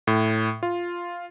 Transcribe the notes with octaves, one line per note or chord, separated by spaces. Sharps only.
A2
F4